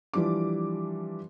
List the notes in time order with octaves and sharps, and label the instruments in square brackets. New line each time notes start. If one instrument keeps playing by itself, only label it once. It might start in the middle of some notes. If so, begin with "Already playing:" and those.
[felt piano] E3 F3 G3 D4 D6